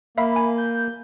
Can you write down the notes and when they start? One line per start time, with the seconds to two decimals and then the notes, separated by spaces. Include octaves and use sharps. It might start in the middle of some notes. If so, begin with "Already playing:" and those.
0.18 A#3 E5 F5 B5
0.36 G#5
0.58 G6